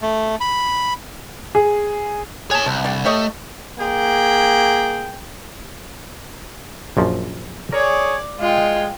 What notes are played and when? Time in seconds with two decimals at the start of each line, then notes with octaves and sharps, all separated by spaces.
0.02 A3
0.41 B5
1.55 G#4
2.51 G#4 C#5 A5
2.66 C2 C3
2.85 D3 G3
3.05 A3 G4 C#5 D#5
3.77 A#3 G#4 G5
6.97 A#1 F#2 F3
7.72 G#4 A#4 C#5 D5
8.40 G#3 F4 G5